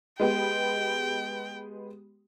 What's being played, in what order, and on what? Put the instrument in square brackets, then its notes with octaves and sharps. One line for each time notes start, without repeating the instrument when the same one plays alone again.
[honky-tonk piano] G#3 B3 G4 [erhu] G5